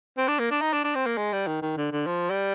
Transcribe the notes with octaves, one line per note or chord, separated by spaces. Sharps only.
C4
D4
A#3
D4
D#4
D4
D4
C4
A#3
G#3
G3
D#3
D#3
D3
D3
F3
G3